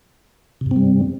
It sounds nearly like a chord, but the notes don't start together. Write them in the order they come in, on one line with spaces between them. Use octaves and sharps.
C3 G2 C4 G3